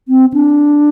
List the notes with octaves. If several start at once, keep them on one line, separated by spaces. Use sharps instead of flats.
C4
D4